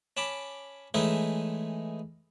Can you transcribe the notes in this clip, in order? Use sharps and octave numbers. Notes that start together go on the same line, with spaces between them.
C#4 A5 B5 D6
E3 G#3 A3 C#4 D#4 E4